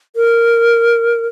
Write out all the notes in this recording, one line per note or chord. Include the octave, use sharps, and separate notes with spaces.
A#4